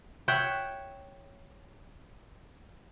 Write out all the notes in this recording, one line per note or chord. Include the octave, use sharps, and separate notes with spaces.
C#5 E5 F#5 G5